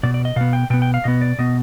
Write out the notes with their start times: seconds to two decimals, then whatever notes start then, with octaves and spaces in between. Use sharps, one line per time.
0.03 B2 B3 D5
0.14 D5
0.25 D#5
0.36 B2 B3 F5
0.53 G5
0.70 B2 G5
0.74 B3
0.82 G5
0.94 F5
1.04 B2 B3 D#5
1.21 D5
1.39 B2 B3 D#5